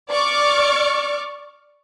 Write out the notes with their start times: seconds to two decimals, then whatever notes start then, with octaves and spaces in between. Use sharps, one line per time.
0.10 D5 C#6 D6 F6